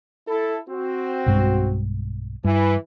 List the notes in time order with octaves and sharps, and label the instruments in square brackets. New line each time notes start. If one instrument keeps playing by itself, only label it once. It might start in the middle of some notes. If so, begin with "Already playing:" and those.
[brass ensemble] E4 A4
C4 F#4
[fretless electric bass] B1 G2 G#3
[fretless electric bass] G2 [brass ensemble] E3